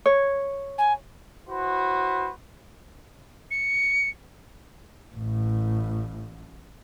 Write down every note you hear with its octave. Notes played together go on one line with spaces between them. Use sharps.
C#5
G#5
E4 F#4 B4 C5
C#7
A1 A2